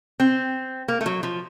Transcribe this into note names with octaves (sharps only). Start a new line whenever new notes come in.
C4
A#3
A3
F#3
F3